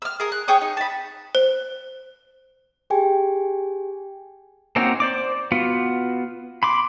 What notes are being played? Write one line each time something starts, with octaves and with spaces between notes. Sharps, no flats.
E6 F6
G#4 A#4
F#6
G#4 C#5 G5 D#6
D#4
A5 B5
C5
G4 G#4 G5 G#5
A#3 C4 C#4 D#4 F#4
C5 D5 D6
B3 F4 F#4
B5 C6 D6